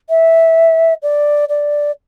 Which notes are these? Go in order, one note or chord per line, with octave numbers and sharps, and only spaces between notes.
E5
D5
D5